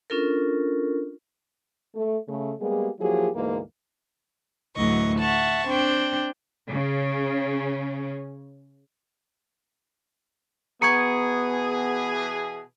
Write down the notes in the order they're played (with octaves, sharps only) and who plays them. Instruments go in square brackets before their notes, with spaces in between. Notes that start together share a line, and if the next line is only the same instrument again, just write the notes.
[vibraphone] C#4 D4 F4 A4 A#4
[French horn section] A3
C#3 A3
G3 G#3 A#3 B3 G4 G#4
F3 F#3 A#3 E4 G4 G#4
D2 G#2 E3 A#3
[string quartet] D2 A2 E3 F#3 D#5 C#6
E5 F#5 A5 C#6
C4 D4 G5
[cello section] C#3 C#4
[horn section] B2 E3 G#4 [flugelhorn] B3 [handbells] A#5 C#6 G#6 [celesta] C#7